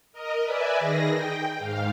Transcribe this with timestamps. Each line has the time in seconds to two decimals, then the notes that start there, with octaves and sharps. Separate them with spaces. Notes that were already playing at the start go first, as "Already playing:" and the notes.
0.13 A#4 D#5
0.43 B4 D5 E5 G#5
0.79 D#3 G#4 A#6
1.14 G5
1.59 G#2 F5